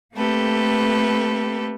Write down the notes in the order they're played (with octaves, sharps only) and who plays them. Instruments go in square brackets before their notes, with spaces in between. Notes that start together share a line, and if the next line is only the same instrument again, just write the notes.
[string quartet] A3 A#3 C4 G4 A4 B4